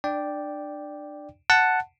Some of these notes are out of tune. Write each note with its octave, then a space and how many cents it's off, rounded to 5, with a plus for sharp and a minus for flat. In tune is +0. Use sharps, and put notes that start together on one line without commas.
D4 +25 D5 +0 G5 +0
F#5 +0 A5 +0